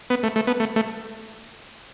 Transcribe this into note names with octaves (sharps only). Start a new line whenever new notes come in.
B3
A3
A3
B3
A3
A3